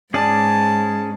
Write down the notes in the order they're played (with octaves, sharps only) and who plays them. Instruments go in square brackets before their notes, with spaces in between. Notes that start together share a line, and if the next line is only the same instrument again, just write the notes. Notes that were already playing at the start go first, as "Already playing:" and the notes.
[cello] G#2 [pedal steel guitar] C#4 G#4 D5 [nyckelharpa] A5